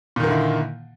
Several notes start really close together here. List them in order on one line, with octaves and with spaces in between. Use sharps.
A#2 D#3 A#3 D3 E4